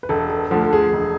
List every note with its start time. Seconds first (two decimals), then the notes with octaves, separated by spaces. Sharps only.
0.03 B4
0.09 E1 A4
0.30 A4
0.51 D2 D3 F3 A4
0.63 A4
0.73 G#4
0.93 E1